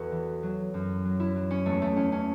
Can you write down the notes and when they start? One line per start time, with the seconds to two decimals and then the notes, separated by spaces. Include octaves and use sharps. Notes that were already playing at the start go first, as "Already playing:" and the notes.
Already playing: E2 F#4 A4 B4
0.12 E3
0.43 F#3
0.74 F#2
1.05 F#3
1.20 E4
1.36 F#3
1.51 C#4
1.66 E2 A3
1.82 A3
1.96 E2 C#4
2.12 C#4